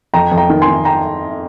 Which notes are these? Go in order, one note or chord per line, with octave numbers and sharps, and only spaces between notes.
F2 G5 A#5
F2
G5 A#5
D#3
G#5 C6
D#3
G5 A#5